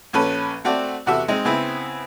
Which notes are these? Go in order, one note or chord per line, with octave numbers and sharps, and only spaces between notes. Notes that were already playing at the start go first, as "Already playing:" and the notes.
A#1 C#4 A4 B4
A3 C4 F#4 A4 D5
E2 C3 F#4 A4 E5
G#3 C4 D#4 D#5
C#3 B3 C4 E4